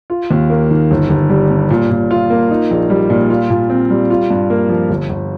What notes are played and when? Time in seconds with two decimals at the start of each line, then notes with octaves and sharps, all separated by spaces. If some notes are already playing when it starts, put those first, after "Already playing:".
0.10 F4
0.31 D#2
0.50 A#3
0.71 D#3
0.91 G1
1.10 G1
1.30 G3
1.51 G2
1.70 A#2
1.91 A#2
2.11 F4
2.30 A#3
2.51 D#4
2.71 A#1
2.90 G3
3.10 A#2
3.30 F4
3.50 A#2
3.70 C4
3.90 G3
4.10 F4
4.30 G2
4.50 A#3
4.69 F3
4.90 G1
5.09 G1